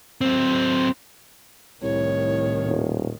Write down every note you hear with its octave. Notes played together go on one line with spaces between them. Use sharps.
F#3 C4
C2 A2 D#3 C#5
D#1